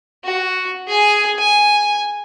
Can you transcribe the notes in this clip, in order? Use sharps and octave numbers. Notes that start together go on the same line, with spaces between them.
F#4
G#4 G#5
G#5